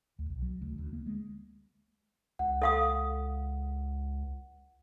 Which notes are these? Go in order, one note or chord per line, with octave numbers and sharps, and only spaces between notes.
D2
B1
F#3
D2
D2
A#3
G#3
C#2 F#5
A4 F5 D#6